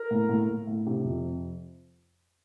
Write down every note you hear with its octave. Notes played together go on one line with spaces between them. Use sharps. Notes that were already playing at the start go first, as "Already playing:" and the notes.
Already playing: A#4
A2
A2
A2
A2
C3
F2